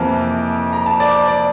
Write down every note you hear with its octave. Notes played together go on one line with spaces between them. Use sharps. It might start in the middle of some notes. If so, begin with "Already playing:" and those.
Already playing: F2 C3 E3 A#3 A5
A#5
A5
D5
D5